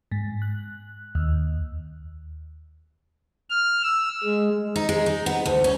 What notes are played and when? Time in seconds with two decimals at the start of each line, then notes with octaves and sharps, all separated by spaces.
0.11 G#2
0.42 F#6
1.15 D#2
3.50 F6
3.83 E6
4.24 G#3
4.76 D#4
4.89 G#3
5.06 D#4
5.26 B3
5.46 D2
5.64 C#4